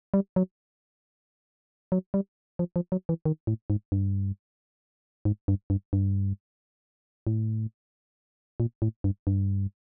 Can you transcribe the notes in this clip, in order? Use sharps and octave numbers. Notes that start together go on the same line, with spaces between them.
G3
F#3
F#3
G3
F3
F3
F#3
E3
D#3
A2
G#2
G2
G#2
G2
G2
G2
A2
A#2
A2
G2
G2